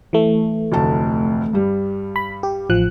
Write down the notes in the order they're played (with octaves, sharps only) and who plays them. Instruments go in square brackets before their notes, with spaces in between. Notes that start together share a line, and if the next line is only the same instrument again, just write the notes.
[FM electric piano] E3 A3
[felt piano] F1 D2 A5
G2 G3
[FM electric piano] B5
G4
A1 F3 F#6